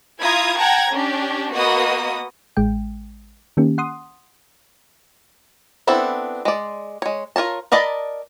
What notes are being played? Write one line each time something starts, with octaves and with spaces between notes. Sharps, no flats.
E4 F4 A#5 D#6 G#6
F#5 G5 A5 A#5 G#6 A#6
C#4 D4 G4
A#3 B3 F#4 D#5 D#6
A1 G#3 G5
D#3 A#3 C#4 G4
F#5 C6 D#6
B3 C4 D4 E4 A4
G#3 D5
G#3 C#5
F4 A#4 C#5 A5
A#4 D5 D#5 A5 B5